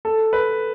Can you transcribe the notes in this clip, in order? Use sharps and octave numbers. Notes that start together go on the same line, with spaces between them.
A4
B4